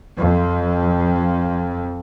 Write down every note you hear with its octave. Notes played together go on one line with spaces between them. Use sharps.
F2